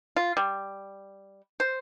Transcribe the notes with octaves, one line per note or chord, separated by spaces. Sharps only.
F4
G3
C5